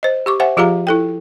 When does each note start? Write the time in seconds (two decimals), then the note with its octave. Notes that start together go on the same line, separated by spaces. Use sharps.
0.03 C5 D#5
0.26 G4 C#6 D6
0.40 C5 E5 F#5 G#5
0.57 F3 F4 G4 G#4 F5 A#5
0.87 E4 A4 G5